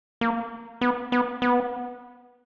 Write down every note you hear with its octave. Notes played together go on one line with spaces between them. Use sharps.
A#3
B3
B3
B3